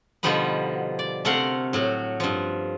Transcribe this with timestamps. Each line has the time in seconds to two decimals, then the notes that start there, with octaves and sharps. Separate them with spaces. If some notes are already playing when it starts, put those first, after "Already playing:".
0.23 B2 D3 F3 G3 D#4 B4
0.99 D5
1.25 C3 A3 A#4 F5 F#5 C6
1.73 A2 F#3 F#4
2.20 G2 F3